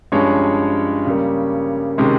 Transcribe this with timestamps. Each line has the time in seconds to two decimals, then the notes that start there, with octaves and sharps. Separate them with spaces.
0.12 G2 F3 G#3 C#4 C#5
1.06 C#3 G3 A#3
1.98 C3 D#3 G#3 C#4